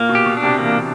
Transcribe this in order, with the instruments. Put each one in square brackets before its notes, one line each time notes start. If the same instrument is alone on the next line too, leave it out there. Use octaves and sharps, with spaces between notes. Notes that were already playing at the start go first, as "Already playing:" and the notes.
Already playing: [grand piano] A#2 [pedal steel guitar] A#3
[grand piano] B2
[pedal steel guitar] G4
[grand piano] B2
[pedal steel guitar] D4
[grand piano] C3
[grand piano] E3 [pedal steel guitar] A#3